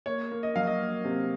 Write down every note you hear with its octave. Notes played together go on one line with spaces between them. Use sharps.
A#3 C#5
A#3
D#5
F#3 F5
D#5
A#3
C3